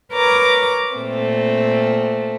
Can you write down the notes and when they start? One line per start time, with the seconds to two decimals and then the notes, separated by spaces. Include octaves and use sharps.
0.14 A#4 B4 C#5 A#5 D6
0.95 A#2 A3 C4